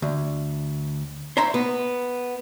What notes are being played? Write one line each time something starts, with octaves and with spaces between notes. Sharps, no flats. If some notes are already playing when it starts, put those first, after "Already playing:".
D2
C5 C#5 E5 A#5 C6
B3